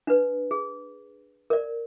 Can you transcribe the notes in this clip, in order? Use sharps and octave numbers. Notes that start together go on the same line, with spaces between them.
D4 B4
G#4
A#4 D5